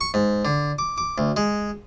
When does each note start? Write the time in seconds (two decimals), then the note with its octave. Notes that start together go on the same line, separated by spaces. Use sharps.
0.01 C#6
0.14 G#2
0.45 D3
0.79 D6
0.98 D6
1.18 D2
1.37 G#3